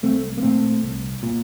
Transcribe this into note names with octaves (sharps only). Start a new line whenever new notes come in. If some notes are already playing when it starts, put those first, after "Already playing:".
C2 A3 C4
A#3
A#2 A3 C4
C2
A#2